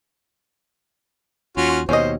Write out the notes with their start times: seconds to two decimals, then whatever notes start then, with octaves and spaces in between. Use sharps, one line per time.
1.57 D#2 C#4 F4 F#4
1.89 D#2 B2 C#4 C5 D#5